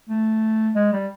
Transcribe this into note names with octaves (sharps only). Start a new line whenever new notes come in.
A3
G#3
G3